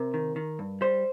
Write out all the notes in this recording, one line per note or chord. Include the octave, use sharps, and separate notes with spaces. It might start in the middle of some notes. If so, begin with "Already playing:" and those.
Already playing: C3 A#4
D#3
D#3
G2
G3 C5